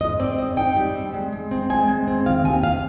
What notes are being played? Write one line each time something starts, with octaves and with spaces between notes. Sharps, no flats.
G#2 D#5
C4 D5
G#2 D#5
D#4 G5
G3
C4
G#3
G#3
C4
G#3 G#5
G#3
C4
D#3 F5
D#2 G#5
F5